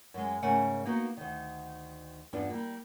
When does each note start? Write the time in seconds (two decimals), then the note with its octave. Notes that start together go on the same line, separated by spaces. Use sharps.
0.14 F#2 G#3
0.42 G#2 C#3 A3 A#4 F#5 G#5
0.85 A#3 B3 D#4 F#4
1.17 D2 D#3
2.33 E2 G2 B3 D4 F4
2.50 G3 A#3